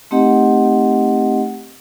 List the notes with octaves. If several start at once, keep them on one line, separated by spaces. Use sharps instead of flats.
A3 C4 D#4 G4 D#5 F#5